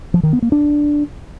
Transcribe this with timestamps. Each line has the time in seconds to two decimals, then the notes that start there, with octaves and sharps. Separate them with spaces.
0.14 F3
0.23 D#3
0.33 B3
0.42 A#3
0.52 D4